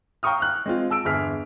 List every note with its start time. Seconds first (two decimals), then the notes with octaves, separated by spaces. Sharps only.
0.23 F5 G5 A#5 C#6 D#6 F6
0.40 F6 F#6
0.66 G#3 C4 F4
0.90 A5 E6 D7
1.05 G1 E2 G#4 F6 B6